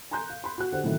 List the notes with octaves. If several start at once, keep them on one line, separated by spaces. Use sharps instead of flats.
G#5 A#5 C6 F#6 G6
F5
B5 C6
F#4 F#6
D3 G4 C5 F#5
A2 C3 D#3 E3 F#3